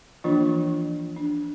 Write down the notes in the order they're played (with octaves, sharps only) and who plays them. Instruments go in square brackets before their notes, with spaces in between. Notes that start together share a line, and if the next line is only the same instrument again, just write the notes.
[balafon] E3 F3 A#3 D4 F4
D4